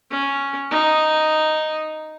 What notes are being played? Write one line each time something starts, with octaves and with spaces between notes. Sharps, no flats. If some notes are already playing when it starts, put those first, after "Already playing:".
C#4
D#4